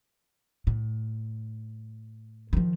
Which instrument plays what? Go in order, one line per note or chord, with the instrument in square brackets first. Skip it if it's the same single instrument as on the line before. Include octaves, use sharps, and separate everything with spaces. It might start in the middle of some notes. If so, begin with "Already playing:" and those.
[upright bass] A2
D#3 F3